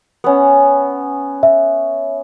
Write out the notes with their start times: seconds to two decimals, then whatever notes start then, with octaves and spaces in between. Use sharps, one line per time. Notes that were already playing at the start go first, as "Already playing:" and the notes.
0.24 B3 C#4
1.43 E5